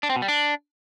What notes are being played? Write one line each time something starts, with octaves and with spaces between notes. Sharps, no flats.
D4
C4
B2
G3
D4